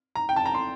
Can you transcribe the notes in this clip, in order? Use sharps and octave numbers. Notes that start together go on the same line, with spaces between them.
A#5
G5
A5
A#5
C6